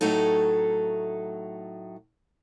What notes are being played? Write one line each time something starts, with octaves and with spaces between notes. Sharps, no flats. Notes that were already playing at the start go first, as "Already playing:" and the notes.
A2 F#3 A3 D#4 A4